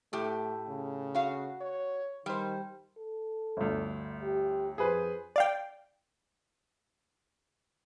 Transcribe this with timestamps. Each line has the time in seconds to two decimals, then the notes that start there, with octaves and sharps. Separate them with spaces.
0.13 A2 A3 G4
0.68 C#3
1.15 F#4 F5
1.61 C#5
2.26 D#3 G3 C5
2.98 A4
3.57 G1 D2
4.23 G4
4.78 F2 G#4 B4 C5
5.36 D5 F5 G5